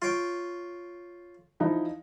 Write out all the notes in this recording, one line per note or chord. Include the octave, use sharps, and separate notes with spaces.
F4 C#5 G5
F3 D#4 E4